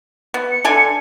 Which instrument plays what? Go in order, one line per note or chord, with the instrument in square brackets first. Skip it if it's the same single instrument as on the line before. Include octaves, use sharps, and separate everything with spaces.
[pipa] B3
[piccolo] C#7
[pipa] D3 A4 G#5